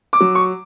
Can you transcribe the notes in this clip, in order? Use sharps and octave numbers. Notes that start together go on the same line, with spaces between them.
D6
F#3
C#6